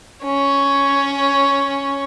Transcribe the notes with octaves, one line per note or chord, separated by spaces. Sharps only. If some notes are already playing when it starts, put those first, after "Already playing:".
C#4 C#5